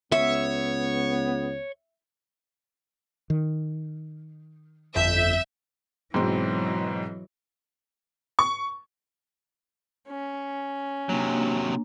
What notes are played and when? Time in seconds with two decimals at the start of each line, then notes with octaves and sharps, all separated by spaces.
0.12 C#2 B3 C#5 E5
3.30 D#3
4.95 G1 F2 E5 G6
6.14 G#2 B2 E3 F#3 C4
8.39 C#6
10.08 C#4
11.09 C3 F#3 A#3 D4